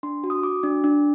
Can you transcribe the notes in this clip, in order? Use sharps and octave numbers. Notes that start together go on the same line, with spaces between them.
D4 C6
F#4
D#6
F#4 D6
D4
D4